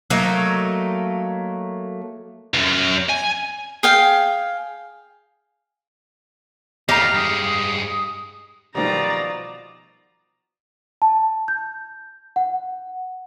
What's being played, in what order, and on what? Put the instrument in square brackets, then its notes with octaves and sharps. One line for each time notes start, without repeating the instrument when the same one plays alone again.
[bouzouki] F#3 A3 A#3 D#4
[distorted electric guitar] C#2 F#2
G#5
[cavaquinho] G#4 F5 G5
[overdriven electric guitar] E2 A3 [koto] G4 F5 [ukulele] D#5 A#5
[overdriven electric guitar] G2 G#3 [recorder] D#6
[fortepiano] B1 D#3 G3 [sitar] B2 F3 [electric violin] D5 A#5
[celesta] A5
G6
F#5